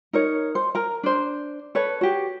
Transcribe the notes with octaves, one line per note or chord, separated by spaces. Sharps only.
D#4 A#4 C#5
C5
A#4 A#5
D4 C5
A4 B4 C#5
F#4 G4